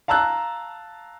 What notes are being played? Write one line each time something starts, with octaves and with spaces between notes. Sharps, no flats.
F5 A5 A#5 E6 F#6